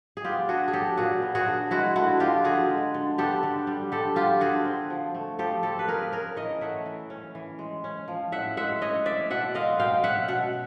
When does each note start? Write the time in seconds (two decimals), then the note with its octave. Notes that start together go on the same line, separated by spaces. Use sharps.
0.17 G#4
0.24 B3 F4 G4
0.49 D4 F#4 G#4
0.68 G#4
0.73 F#3 G4 A4
0.97 A#2 F#4 G#4
1.22 B3
1.35 F#4 G#4
1.47 D4
1.71 G#3 E4 F#4
1.96 D3 E4 F#4
2.20 F3 F4 G4
2.44 D3 F#4 G#4
2.70 G#3
2.94 D3
3.18 B3 G4 A4
3.43 D3
3.67 G3
3.92 D3 G4 A4
4.16 B3 F4 G4
4.40 D3 F#4 G#4
4.65 C4
4.90 F3
5.15 A3
5.39 F3 G4 A4
5.63 C4 G4 A4
5.79 B4
5.87 F3 G#4 A#4
6.12 C#4 G#4 A#4
6.36 E3 C#5 D#5
6.61 A3 E5 F#5
6.86 E3
7.10 C#4
7.35 E3
7.59 G#3
7.84 C#4
8.08 F3
8.32 A2 E5 F#5
8.57 G#3 E5 F#5
8.81 C#4 C#5 D#5
9.05 C#4 D5 E5
9.30 B2 E5 F#5
9.54 G#3 D#5 F5
9.79 B2 F5 G5
10.04 C#4 E5 F#5
10.28 B2 E5 F#5